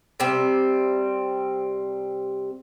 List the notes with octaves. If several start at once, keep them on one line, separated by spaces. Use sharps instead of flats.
C3 G3 C4